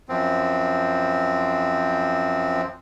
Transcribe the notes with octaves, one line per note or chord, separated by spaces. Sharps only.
F#2 F3 C4